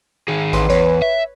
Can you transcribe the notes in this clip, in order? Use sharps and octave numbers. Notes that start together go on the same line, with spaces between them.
D#3 G#4
A1 B4 C6
E2 B4 C#5
E5